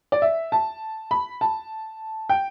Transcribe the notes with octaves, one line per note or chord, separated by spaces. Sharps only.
D5
E5
A5
B5
A5
G5